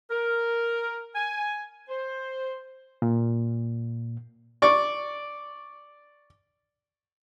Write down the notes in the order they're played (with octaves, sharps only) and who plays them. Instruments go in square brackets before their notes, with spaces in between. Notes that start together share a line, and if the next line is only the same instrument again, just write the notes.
[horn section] A#4
G#5
C5
[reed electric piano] A#2
[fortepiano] D5 C#6